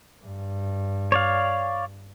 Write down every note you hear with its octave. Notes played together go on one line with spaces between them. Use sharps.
G2
C#5 D5 F5